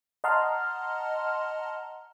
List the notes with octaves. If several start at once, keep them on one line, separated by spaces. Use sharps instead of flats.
D#5 F#5 A5 A#5 C6 F6